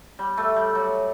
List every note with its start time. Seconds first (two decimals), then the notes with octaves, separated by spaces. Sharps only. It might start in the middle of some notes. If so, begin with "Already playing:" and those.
0.19 G3
0.37 A3
0.56 G3
0.75 F#3